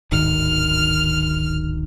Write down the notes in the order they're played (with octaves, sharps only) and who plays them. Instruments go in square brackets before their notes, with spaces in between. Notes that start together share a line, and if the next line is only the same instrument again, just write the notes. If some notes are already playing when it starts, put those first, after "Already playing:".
[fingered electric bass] D1 G#1 D#3 [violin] F6